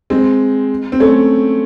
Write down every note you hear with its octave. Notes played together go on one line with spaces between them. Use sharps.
G#3 C4
C4
A3 C#4